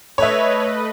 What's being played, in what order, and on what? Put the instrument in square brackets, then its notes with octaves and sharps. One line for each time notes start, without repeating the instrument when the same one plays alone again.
[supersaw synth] A3 B4 D#5 [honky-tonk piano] C#5 E5